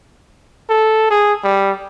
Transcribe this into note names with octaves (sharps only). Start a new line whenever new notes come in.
A4
G#4
G3